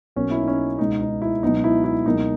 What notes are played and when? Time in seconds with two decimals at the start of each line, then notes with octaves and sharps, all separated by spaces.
0.16 B1 B2 A#3 C#4
0.31 E4
0.40 D#4
0.48 C#4
0.79 C#2 B2 G#3 B3 D#4
1.01 D#4
1.22 E4
1.43 C#2 B2 F#3 B3 D#4
1.64 E4
1.84 E4
2.06 C#2 B2 F#3 A#3 D#4